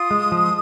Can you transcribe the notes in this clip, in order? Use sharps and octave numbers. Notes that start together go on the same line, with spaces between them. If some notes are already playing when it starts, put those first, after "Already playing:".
Already playing: F4 D#6
G#3
F3